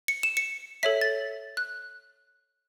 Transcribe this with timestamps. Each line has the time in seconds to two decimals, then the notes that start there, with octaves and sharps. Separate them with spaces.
0.08 C#7
0.23 E7
0.37 C#7
0.83 A4 C#5 E5 B6
1.01 A6
1.57 F#6